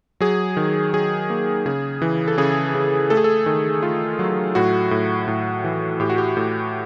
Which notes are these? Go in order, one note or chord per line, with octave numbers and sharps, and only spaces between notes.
F#3 G#4
D#3
F#3 G#4
A#3
C#3 G#4
E3
A4
C#3 G#4
C#3
A3 A4
G#4
A4
D#3 A4
A3 F4
F#3
A2 F#4
A2
A2
E3
A2 G4
F#4
G4
A2